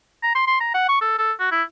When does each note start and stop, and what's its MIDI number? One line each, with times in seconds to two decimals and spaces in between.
0.23 0.33 82
0.35 0.45 84
0.47 0.56 84
0.60 0.72 82
0.74 0.88 78
0.89 0.97 85
1.01 1.17 69
1.18 1.32 69
1.40 1.47 66
1.52 1.63 64